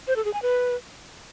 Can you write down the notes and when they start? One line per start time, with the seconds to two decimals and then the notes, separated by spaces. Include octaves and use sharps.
0.07 C5
0.16 A4
0.25 G#4
0.34 G#5
0.42 B4